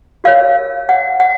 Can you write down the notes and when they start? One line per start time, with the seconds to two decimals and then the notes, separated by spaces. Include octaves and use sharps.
0.24 F#4 A#4 C#5 F5
0.89 F#5
1.20 F#5